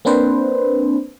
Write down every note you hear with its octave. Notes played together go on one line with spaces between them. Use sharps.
A#3 C4 D4 B4 C5